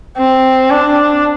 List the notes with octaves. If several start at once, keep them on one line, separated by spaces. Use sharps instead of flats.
C4
D4